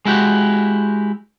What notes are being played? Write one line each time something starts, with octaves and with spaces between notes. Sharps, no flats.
G#3 E4 F#4 G4